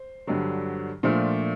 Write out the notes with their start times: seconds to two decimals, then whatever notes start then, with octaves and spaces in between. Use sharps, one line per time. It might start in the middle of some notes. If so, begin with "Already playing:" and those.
Already playing: C5
0.27 G2 D3 F#3
1.03 A#2 F3 A3 D4 F4 C5